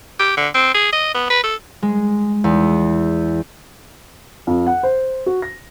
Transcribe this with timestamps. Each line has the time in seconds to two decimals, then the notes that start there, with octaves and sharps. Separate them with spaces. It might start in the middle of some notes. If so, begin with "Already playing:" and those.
0.19 G4
0.37 D3
0.54 C4
0.74 G#4
0.92 D#5
1.14 B3
1.30 B4
1.43 A4
1.83 G#3
2.44 E2
4.47 F2
4.67 F#5
4.83 C5
5.26 F#4
5.42 A#6